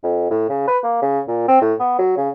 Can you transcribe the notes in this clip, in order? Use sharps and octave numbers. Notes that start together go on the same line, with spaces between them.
F2
A2
C#3
B4
A#3
C#3
A#2
C4
A2
B3
F#3
C#3